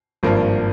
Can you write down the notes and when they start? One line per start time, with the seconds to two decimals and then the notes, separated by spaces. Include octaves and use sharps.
0.23 G#1 G2 F3 A#3